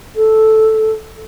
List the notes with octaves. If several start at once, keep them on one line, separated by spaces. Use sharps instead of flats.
A4